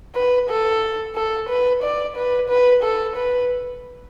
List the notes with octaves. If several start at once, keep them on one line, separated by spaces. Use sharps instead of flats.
B4
A4
A4
B4
D5
B4
B4
A4
B4